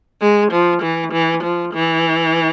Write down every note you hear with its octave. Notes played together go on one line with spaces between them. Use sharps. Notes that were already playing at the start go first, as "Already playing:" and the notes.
G#3
F3
E3
E3
F3
E3